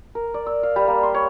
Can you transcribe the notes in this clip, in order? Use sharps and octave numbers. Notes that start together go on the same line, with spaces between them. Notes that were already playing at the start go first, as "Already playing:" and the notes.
A#4
D5
E6
F5
G3
A#3
C6
C#5